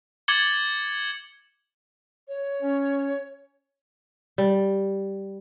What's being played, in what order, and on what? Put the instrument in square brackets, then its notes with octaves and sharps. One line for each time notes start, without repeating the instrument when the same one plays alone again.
[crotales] D6 G#6 A6 C#7 F#7 G7
[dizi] C#5
[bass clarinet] C#4
[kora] G3